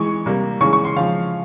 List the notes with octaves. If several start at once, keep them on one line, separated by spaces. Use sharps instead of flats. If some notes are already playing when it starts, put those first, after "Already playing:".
Already playing: E3 G#3 C#6
C3 G3 A#3
C#3 E3 G#3 C#6
C#6
C6
C#3 F3 G#3 F5